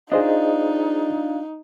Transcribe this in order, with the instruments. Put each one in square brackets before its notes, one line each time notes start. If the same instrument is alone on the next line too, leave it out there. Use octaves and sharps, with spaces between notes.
[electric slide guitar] D4 F4 [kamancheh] D#4 [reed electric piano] G#4 C5 D#5